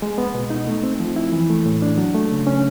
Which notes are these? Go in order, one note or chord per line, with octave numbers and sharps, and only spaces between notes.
G#3
B3
B2
D#4
A3
C4
F3
E4
E3
A3
A2
D4
F#3
A3
C#3
C#4